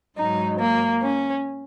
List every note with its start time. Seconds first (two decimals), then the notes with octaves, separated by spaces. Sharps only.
0.17 G#2 F#3 D#4
0.60 A#3
1.02 C#4